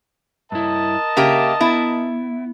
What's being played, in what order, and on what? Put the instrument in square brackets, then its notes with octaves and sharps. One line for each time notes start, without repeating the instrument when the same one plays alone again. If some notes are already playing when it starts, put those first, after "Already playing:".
[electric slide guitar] G2 E4 [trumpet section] A#4 D#5 A5
[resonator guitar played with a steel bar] C#3 A#3 G4 [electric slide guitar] E5
[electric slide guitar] B3 [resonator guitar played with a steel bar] E4